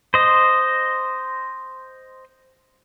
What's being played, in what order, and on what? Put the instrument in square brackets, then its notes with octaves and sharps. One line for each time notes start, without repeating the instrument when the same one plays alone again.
[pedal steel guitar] C5 D#5